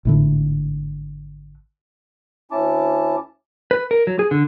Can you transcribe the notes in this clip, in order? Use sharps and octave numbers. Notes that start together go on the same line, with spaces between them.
G#1 A2 D3
D2 C#4 E4 A5 D6
B4
A#4
F#3
G#4
D3